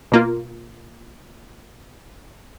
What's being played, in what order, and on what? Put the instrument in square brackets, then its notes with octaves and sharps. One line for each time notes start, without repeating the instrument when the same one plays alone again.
[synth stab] B2 A#3 F4